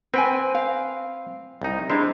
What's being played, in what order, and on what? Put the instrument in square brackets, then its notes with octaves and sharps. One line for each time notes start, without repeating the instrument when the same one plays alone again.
[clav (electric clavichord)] C4 B4 [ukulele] C5 G5 G#5
[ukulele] F5
[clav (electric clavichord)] C2 D#4
[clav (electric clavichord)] G#3 E4 C5 [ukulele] D4 A#5